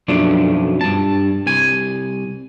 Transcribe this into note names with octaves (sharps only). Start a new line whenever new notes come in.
B1 F#2 F3 A3 D4
G2 A5
C2 G#5